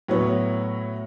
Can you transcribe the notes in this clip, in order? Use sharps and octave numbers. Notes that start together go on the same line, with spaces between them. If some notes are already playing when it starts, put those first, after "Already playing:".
A2 F#3 B3 C#5